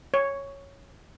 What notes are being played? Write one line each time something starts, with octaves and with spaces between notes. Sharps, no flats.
C#5